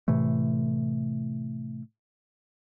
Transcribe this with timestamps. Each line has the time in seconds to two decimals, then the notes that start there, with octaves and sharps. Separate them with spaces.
0.08 A2 C3 E3 A3